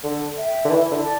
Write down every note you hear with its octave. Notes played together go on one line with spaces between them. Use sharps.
D3 A4
E5 G5
D3
E3 E4
D3
D5 A5